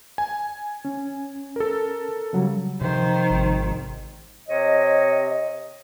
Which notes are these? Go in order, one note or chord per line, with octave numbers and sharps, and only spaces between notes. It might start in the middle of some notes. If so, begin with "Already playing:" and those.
G#5
C#4
A4 A#4
C#3 F#3 G3
C3 D#3 F3 C5
G#1
C3 C#5 D#5